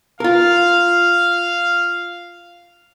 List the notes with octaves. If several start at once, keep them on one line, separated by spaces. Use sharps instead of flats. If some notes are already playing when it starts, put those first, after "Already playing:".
F4 A#4 F5